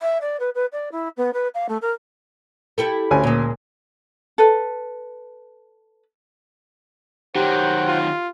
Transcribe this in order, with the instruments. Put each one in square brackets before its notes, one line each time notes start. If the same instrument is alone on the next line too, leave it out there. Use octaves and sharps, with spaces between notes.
[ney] E5
D5
B4
B4
D5
E4
B3
B4
F5
A3
A#4
[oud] E4 G4 A4
[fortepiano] D2 C#4 G#5
[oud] A#2 G#3
[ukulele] A4 B4
[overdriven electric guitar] D#3 F#3 [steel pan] G4 [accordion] C5 F#5 G5
[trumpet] F4